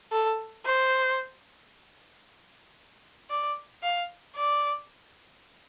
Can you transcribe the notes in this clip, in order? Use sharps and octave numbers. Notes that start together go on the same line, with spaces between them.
A4
C5
D5
F5
D5